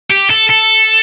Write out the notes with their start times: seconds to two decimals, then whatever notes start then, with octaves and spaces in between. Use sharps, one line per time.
0.10 G4
0.30 A4
0.49 A4